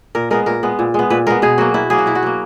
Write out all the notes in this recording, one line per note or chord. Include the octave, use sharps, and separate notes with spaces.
A#2 A#4
G#3 B3 A#4
A#2 A#4
G#3 B3
A#2
G#3 B3
A#2 B4
G#3 B3 A#4
B2 G#4
F#3 A#3 F#4
B2 E4
F#3 A#3 G#4
F#4
B2 E4
F#4
F#3 A#3